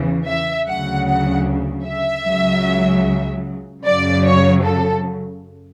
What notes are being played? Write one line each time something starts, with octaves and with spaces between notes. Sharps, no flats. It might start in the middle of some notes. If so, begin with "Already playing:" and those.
Already playing: E2 C#3 E3
E5
D2 C#3 F#3 F#5
F#5
E5
C#2 C#3 F#3
F#2 C#3 F#3 D5
C#5
A4